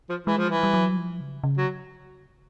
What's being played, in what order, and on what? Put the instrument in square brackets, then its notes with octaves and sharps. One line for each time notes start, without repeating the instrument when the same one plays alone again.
[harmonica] F3
[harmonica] E3 [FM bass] G#3
[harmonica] F3
[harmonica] E3 [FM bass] G3
[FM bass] G3
F#3
F3
C#3
C#3
[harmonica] F#3